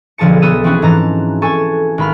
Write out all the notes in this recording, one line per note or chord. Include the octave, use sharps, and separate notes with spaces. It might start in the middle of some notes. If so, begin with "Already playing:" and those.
B1 D3 F3 G#4 A5 C#7
B1 B3 A4 D#6 E6 D#7
E3 C4 C#4 E4 F#4 G#4
G#2 E3 A5 A#5
A4 G#5 A5 C#6 G#6
G#1 B5 F6